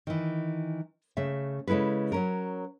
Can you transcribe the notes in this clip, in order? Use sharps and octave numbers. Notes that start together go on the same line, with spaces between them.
D#3 E3
C#3 A3 E5
C#3 G#3 E4 A4 B4
F#3 C#4 A#4